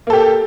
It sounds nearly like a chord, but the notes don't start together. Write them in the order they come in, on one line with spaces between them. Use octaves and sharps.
A#3 A4 G4